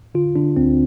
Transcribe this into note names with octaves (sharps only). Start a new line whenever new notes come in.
D3 F4
D3 D4
D2 C4